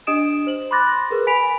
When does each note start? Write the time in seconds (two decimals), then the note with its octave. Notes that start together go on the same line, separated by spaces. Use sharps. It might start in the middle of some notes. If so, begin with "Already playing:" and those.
0.07 D4 G4 D#5 D#6 D7 E7
0.47 C5 F#7
0.71 B5 C6 D6 F#6 A6 A#6
1.10 G#4 A#4 B4
1.27 G#5 B5 B6 D7 F7